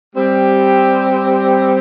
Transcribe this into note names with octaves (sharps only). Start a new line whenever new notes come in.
G3 C4 G4